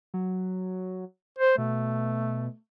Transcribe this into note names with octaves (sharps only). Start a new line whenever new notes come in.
F#3
C5
B2 A3